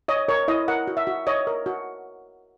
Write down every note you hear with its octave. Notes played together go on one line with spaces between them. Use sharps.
C#5 D#5
A#4 C#5
E4 D#5
A#4 F#5
F#4
E5
F#4
C#5 D#5
A#4
F#4